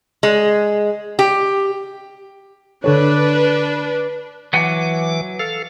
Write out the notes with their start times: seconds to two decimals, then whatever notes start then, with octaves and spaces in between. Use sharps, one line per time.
0.23 G#3
1.19 G4
2.84 D3 D4 A4 B4 C#5
4.53 E3 F#3 F#5 G#5 D6
5.39 A4 F5